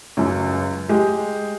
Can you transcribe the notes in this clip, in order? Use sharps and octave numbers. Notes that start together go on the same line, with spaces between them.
C#2 F#2
G#3 G4